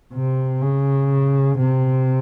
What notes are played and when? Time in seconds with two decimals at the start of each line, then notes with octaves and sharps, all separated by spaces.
0.13 C3
0.61 C#3
1.58 C3